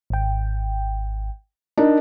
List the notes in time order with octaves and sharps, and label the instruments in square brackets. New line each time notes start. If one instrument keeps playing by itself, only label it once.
[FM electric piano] G#1 G5
[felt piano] D4 D#4 A#4